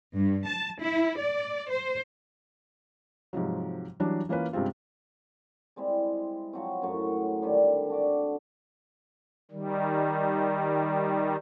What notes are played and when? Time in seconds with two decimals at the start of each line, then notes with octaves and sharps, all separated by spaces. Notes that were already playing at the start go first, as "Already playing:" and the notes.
0.15 G2
0.46 A5
0.80 E4
1.17 D5
1.69 C5
3.33 G#2 C3 F3 F#3
4.00 E3 F#3 G3 D4
4.29 E3 A#3 C#4 F4 B4
4.53 G2 C3 G#3 C4 F4
5.76 G3 G#3 C4 E4
6.53 F3 F#3 C4
6.82 F#2 A2 F#3
7.42 D3 D#3 G3
7.90 D4 F#4 D6
9.51 D#3 G3